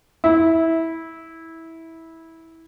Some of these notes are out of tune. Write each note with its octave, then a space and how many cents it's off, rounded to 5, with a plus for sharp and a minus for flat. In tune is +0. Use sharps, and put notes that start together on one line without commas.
E4 -15